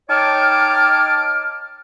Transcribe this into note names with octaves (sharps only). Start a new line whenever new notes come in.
D#4 C#5 G5 A5 D6 F6